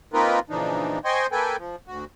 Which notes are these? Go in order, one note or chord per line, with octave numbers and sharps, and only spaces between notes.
A#3 C4 D#4 F4 A#4 B4
A#2 C#3 E3 F3 D4 D#4
C5 D#5 G5 G#5 C6 C#6
A#3 A4 B4 G5 G#5
F3
D2 F#4